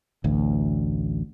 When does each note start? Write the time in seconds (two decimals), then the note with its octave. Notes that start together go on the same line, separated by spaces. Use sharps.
0.24 A1 D2